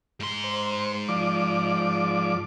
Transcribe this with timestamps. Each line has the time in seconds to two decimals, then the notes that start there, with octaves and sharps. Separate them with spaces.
0.20 G#2 C6
0.44 C5
1.08 F3 D5 D6